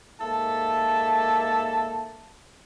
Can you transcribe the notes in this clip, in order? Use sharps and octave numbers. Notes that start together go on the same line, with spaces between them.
G#2 A#3 A4 E5 A5